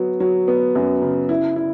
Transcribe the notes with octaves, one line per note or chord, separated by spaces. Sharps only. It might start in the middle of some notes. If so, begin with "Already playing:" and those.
Already playing: F#3 B3
F#3
B3
F#2
C#3
E4
E4